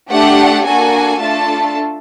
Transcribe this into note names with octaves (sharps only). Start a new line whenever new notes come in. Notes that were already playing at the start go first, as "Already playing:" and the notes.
A3 D4 G4 F#5
A#3 D4 F#4 A4 G#5
A3 D4 F4 A4 A5